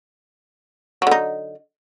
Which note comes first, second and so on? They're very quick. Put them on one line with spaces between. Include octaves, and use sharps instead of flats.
F#3 D3 D#4